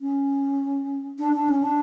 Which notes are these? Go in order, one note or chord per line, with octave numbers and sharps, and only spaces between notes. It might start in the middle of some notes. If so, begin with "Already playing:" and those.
C#4
D4
D4
C#4
D4